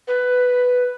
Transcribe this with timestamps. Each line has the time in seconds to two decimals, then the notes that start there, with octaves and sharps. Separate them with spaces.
0.08 B4